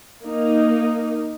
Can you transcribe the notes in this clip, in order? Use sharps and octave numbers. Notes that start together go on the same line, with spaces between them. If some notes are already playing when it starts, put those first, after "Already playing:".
A#3 D#4